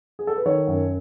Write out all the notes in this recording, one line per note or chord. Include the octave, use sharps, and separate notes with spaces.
G#4
A4
B4
D#3 A4 C#5
F#2